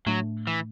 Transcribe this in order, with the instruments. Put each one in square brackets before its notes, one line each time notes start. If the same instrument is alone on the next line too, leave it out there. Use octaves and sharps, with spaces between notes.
[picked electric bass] A2 A3 D4 [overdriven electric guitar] F#3
[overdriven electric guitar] E3